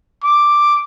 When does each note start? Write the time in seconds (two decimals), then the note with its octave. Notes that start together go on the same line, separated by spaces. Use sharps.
0.24 D6